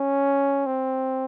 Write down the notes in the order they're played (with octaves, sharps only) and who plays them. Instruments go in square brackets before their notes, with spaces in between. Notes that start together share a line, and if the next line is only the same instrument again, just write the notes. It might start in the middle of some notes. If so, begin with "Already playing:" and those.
Already playing: [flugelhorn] C#4
C4